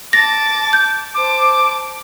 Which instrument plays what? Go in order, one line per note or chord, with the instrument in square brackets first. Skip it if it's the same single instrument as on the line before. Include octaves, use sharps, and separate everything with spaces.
[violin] A5 D6 [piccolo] A6 [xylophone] A#6
[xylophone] G6
[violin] C5 A5 [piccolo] D6